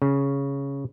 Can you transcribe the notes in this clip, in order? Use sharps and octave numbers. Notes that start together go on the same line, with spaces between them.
C#3